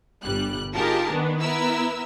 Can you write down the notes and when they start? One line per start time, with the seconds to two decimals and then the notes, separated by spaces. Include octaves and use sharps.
0.22 G1 G3 F#6
0.74 D#4 F4 G4 G#4 A#4 A5
1.11 D#3 B3 D4
1.40 B3 E4 A#4 B4 E6